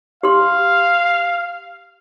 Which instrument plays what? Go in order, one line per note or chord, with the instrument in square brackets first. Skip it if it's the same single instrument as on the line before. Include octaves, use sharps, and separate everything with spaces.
[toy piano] G4 C6 [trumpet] F5